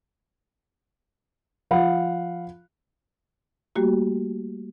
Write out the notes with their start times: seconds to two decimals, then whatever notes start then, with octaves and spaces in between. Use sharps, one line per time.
1.71 F3 F5 F#5 B5
3.76 G3 A3 A#3 F#4 G4